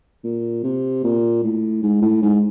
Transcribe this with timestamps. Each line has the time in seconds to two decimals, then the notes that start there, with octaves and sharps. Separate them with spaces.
0.24 A#2
0.63 C3
1.03 A#2
1.43 A2
1.82 G#2
2.02 A2
2.22 G#2